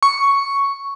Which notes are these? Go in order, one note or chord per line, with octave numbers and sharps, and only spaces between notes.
C#6